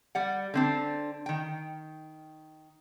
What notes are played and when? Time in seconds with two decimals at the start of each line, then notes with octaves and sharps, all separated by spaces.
0.15 G3 D5 F#5
0.54 D3 C4 D4
1.26 D#3 G5